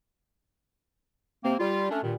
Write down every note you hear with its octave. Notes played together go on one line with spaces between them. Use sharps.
C3 A#3 C4
G3 F4
A3 C#4 D4
G2 A#2 D#3